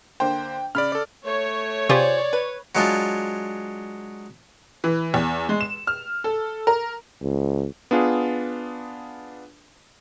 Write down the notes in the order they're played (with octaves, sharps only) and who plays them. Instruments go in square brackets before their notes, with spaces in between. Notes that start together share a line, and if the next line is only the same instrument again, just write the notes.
[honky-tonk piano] D3 A#3 C5 [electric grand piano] G5
[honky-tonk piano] C#3 [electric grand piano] D5 B5 F6
[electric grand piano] A4 D5
[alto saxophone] A3 [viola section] C#5
[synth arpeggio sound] C3 G4 [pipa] F4 G#4 C5 [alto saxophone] D5
[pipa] B4
[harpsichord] F#3 G#3 D4 F4
[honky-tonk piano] E3
E2
G#3
E7
F6
A4
A#4
[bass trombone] C#2
[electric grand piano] B3 D4 F4 G#4